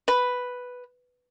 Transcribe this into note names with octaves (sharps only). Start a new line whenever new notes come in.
B4